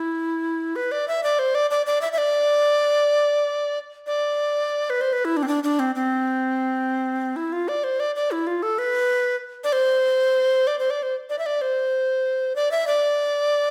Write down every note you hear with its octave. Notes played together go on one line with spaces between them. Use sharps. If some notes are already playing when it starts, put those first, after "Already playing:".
Already playing: E4
B4
D5
E5
D5
C5
D5
D5
D5
E5
E5
D5
D5
B4
C5
B4
E4
D4
C4
D4
D4
C4
C4
E4
F4
D5
C5
D5
D5
E4
F4
A4
B4
D5
C5
D5
C5
D5
C5
D5
E5
D5
C5
D5
E5
D5